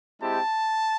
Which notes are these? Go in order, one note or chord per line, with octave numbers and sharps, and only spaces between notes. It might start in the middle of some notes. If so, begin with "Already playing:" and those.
G#3 C4 E4 G4 A5